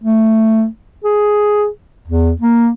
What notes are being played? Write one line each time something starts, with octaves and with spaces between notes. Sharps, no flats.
A3
G#4
E2
A#3